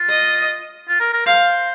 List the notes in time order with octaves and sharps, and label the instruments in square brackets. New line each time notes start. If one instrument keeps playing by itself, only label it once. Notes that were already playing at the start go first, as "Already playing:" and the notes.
Already playing: [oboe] F4
[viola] D#5
[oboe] F4
A#4
A#4
[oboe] C5 [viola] F5